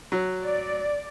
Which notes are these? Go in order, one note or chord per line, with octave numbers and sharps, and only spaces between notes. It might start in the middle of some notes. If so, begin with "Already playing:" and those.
F#3
D5